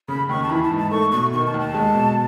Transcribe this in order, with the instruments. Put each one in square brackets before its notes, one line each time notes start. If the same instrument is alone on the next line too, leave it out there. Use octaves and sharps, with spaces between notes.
[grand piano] C#3 [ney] B5
[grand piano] D#2 [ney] C#6
[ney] A5
[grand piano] E3 [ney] B5
[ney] A5
[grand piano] G#2
[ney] A5
[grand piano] A3 [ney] C#6
[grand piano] B2 [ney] C#6
[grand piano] D#3 [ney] C#6
[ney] A5
[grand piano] D#2
[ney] A5
[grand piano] G#3
B2